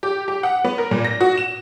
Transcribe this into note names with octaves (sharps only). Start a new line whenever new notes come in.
G4
G4
F#5
B3
A#4
A#2
A#6
F#4
E7